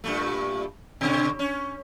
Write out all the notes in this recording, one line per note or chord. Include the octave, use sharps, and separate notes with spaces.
G2 A#2 A3
B2 D3 C#4
C#4